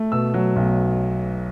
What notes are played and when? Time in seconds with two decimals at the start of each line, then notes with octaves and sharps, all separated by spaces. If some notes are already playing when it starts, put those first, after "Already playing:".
Already playing: A3
0.12 B2 E6
0.34 F#3
0.56 B1